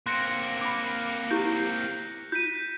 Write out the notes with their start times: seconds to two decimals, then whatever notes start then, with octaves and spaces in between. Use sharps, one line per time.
0.06 A#3 C4 C6 F#6 A#6 C#7
0.61 B5 D6
1.31 E4 G4 A#4 G6
2.32 F4 G6 B6 D#7